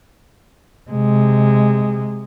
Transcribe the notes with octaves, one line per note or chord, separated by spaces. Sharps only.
C3 G#3